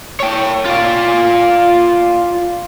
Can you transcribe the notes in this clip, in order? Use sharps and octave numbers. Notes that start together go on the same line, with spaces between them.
C#5 G5
F4 D5